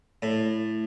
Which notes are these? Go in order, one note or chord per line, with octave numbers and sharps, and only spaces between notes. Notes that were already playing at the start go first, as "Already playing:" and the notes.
A2